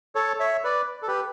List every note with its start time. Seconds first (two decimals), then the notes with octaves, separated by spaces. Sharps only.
0.15 A4 C#5
0.40 C#5 E5
0.64 B4 D5
1.03 A4
1.07 G4 B4